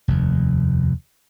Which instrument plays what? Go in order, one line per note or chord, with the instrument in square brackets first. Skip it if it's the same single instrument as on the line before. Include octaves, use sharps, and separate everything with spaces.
[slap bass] F1 D#2